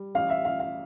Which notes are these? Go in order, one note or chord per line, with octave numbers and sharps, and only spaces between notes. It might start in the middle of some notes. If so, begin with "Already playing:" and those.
Already playing: G3
A1 F5
E5
A1 F5
F5